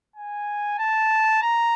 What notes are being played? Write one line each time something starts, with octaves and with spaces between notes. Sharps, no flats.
G#5
A5
A#5